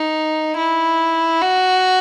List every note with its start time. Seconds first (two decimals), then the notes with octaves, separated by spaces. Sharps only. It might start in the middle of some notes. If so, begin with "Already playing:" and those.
Already playing: D#4
0.57 E4
1.41 F#4